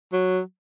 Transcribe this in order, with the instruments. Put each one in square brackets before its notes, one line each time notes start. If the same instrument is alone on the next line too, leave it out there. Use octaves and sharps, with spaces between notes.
[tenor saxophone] F#3